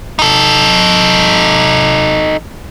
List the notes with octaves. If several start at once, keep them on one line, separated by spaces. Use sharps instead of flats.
D#4 A4